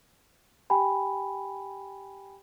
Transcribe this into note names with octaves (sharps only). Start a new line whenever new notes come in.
G4 G5 G#5 B5